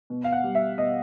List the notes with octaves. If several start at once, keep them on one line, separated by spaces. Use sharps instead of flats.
B2
F5
F#5
G3
E5
B2 D#5